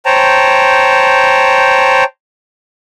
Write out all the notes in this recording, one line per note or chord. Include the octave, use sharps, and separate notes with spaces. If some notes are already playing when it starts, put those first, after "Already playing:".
C5 C#5 G5 A5 A#5